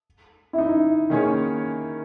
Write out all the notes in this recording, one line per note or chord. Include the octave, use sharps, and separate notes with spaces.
E4
D#4
D#3 A#3 C#4 G#4 C#5